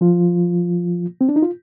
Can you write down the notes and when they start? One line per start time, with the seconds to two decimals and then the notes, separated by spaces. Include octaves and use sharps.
0.01 F3 F4
1.21 C4
1.29 D4
1.36 D#4
1.43 F4